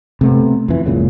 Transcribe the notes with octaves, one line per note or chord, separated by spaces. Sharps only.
C3 A3 B3
F2 E3
F#1 C#2 A#2 C#3